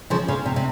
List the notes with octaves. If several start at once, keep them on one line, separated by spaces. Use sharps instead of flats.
C#3 F3
C#3
C3
C3